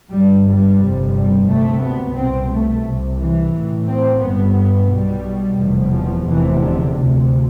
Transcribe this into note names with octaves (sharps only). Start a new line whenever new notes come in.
G2 G3
G1
G3
G1 F2 C3
G3
D2 C3 A3
B3
C2 B2 C4
A3
C2 C3
E3
A1 A2
C4
G1 G2 B3
B3
B1 B2 G3
F1 E2 B2
F3
F1 E2 C3 E3
D3
D2 C3